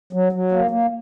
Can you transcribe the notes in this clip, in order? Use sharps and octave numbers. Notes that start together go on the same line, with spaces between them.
F#3
F#3
A#3
A#3